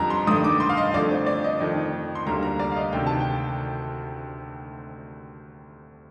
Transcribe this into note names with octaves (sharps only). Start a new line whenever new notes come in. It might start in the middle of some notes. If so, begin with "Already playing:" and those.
Already playing: F2 D3 G3 A#5
C6
G2 D#3 A3 D#6
D6
C6
F5
D#5
F2 D3 A3 D5
C5
D5
D#5
F2 D#3 A3
C6
D2 D3 G3 A#3 A#5
A#5
D5
F5
D#5
D2 C3 D#3 G5
A5
G5